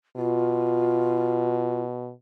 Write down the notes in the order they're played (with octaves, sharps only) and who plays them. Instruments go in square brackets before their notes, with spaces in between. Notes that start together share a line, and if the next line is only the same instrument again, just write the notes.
[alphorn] B2 [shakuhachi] F4